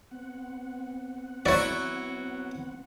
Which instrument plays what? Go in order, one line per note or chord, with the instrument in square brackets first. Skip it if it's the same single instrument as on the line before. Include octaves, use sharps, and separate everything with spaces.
[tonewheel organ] B3 C4 F#5
[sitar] F#3 E4 F#4 [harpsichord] C#5 D5